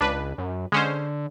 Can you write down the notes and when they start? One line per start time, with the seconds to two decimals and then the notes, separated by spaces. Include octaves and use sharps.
0.01 C#2 D4 B4
0.38 F#2
0.72 D3 G#3 C#4 C5